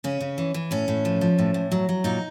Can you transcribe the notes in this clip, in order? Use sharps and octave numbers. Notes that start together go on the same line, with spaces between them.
C#3 C#4
C#3
E3
E3
A2 C#4
A2
F3
F3
A2
A2
F#3
F#3
A#2 D#4